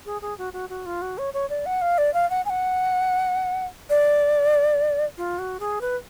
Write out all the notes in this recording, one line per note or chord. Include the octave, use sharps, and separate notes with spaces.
G#4
G#4
F#4
F#4
F#4
F4
F#4
C#5
C#5
D5
F#5
F5
D5
F5
F#5
G#5
F#5
D5
F4
F#4
G#4
B4